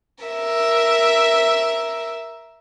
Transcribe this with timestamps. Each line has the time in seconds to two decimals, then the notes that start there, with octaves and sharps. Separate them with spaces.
0.24 A#4 E5